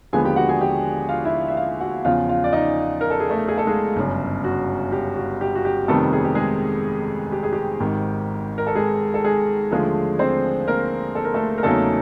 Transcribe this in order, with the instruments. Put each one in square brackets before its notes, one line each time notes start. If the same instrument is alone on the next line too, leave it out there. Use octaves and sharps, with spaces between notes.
[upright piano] D#2 D3 F3 G#3 B3 G#4 G#5
G4 G5
F#4 F#5
G#4 G#5
G4 G5
F4 F5
E4 E5
E5
F4 F5
F#4 F#5
E2 C#3 F3 F4 F5
F4 F5
D5
D#4 D#5
A#4
A4
G#4
A3 A4
G#4
A4
G#3 G#4
G1 F#2 C#3
F#4
G4
F#4
G4
F#4
G4
F2 C3 D#3 G3 A3 B3 A4
G#4
G4
G#3 G#4
G4
G#4
G4
G#1 G#2 D#3
A#4
A4
G#3 G#4
A4
G#3 G#4
D#2 D3 F3 G#3 A3 G#4
C4 C5
A#3 A#4
A4
A#4
A3 A4
A#4
E2 C#3 F#3 A3 A#3 D#4 A4